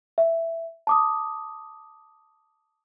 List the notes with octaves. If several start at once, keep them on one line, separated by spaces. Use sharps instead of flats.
E5
A5 D6 D#6